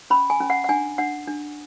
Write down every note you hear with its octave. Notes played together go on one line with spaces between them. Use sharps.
C#4 B5
G#5
C#4
F#5
F#5
D4 G#5
D4 F#5
D4